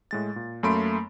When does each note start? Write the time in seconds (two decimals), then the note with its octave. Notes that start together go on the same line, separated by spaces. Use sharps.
0.11 A2 G#3 A6
0.36 A#2
0.63 F#2 A3 A#3 B5 C6 D7